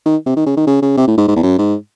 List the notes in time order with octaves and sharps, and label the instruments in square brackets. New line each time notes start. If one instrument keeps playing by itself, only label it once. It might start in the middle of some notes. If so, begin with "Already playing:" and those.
[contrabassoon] D#3
C3
D#3
C#3
D#3
C#3
C#3
C3
A2
G#2
G#2
E2
F#2
G#2